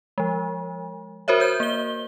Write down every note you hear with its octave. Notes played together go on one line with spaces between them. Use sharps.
F3 G#3
F#4 A#4 C5 C#5 E5
C5 C#5 G6
A#3 G7